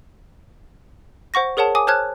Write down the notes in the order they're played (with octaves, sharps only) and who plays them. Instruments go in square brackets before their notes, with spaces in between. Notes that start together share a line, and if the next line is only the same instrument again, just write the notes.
[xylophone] C5 F#5 C#6 A#6
G#4 A#4 C#5 F#5 A5
G#5 D6 D#6
C5 C#5 A5 F6 F#6 G#6